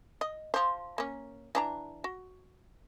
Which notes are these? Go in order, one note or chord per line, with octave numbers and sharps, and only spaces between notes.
D#5
F3 C5
A#3 C#4
E3 D4 A#5
F#4